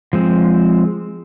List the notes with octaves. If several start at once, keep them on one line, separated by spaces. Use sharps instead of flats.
F3 G#3 C4